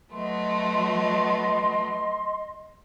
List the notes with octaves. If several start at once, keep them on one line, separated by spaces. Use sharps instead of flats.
F#3 A3 B3 D#5 C6